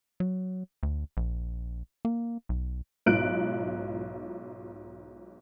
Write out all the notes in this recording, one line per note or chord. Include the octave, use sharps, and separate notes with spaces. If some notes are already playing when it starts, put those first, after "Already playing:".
F#3
D2
A#1
A#3
B1
B1 G#2 E4 F4 F#6 D7